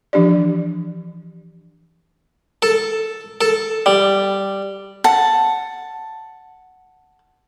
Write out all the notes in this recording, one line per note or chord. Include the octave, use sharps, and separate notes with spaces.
E3 F3 D4 G4 D5
A4
A4
G3
F#5 A5